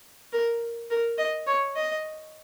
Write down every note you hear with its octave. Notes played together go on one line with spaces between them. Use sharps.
A#4
A#4
D#5
C#5
D#5